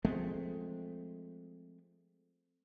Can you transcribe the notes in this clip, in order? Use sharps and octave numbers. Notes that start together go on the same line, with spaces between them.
F3 G#3 A3 C4